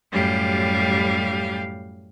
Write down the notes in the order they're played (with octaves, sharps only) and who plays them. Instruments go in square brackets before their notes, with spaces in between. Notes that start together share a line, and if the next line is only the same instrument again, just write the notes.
[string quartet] F#2 A2 G3 G4 F5